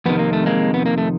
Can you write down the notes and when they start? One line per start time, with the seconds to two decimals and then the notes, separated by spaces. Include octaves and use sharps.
0.06 F2 C3 D#3 B3
0.19 A#3
0.33 A3
0.46 G#3 A#3
0.74 B3
0.86 A#3
0.98 A3